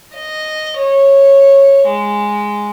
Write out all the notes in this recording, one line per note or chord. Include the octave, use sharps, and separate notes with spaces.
D#5
C#5
G#3